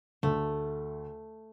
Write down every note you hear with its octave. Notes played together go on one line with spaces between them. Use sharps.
D2 A3